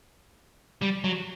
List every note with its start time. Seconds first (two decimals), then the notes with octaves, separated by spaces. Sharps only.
0.82 G3
1.04 F#3